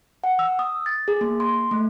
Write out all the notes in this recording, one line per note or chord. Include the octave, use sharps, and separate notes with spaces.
F#5
E6
D#6
A6
G#4
A#3
C6
A3